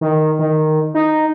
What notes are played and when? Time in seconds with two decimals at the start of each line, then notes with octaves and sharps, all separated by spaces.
0.01 D#3
0.39 D#3
0.94 D#4